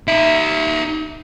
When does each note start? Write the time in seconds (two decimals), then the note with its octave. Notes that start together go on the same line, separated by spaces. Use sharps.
0.08 D#4 E5